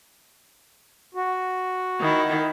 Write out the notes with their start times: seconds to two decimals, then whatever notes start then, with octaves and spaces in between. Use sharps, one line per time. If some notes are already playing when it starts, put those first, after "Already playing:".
1.15 F#4
2.01 D#3 E4